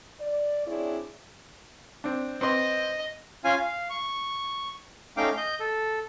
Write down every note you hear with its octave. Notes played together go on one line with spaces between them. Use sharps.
D5
C4 D4 E4 G#4 C#5 D5
C4 D4
C4 B4 D#5 C6
C#4 F4 F5 G#5
F5
C#6
A3 C#4 D#4 F5 G5 D6
D#5 G6
A4